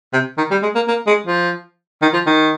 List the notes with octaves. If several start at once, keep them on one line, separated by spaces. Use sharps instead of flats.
C3
D#3
G3
G#3
A#3
A#3
G#3
F3
D#3
F3
D#3